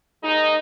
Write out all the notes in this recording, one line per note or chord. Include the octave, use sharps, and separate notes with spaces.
D#2 D#3 G#3 D#4